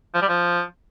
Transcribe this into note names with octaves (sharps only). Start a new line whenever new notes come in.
F3
G3
F3